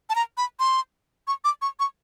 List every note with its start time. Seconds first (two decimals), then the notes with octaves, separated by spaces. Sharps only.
0.10 A5
0.15 A#5
0.37 B5
0.60 C6
1.27 C#6
1.44 D6
1.62 C#6
1.80 C#6